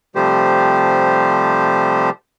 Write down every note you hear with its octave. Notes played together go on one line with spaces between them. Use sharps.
C3 F3 G3 A3 G4 C5